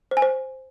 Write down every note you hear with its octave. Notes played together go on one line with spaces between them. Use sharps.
C5
G#5
C5